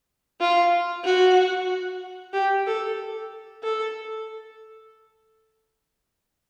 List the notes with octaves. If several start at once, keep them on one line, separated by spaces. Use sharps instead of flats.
F4
F#4
G4
A4
A4